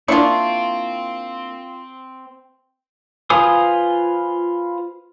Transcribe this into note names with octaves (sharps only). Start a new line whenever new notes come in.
A#3 C4 D4 E4 F4 C#6
F4 B4 C5 G#5 D#6